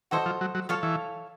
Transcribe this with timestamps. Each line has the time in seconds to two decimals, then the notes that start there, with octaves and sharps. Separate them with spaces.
0.11 E3 F#4 A4 C5 D#5
0.26 F3
0.41 F#3
0.55 F#3
0.69 F3 A4 C#5 F5 A5
0.83 E3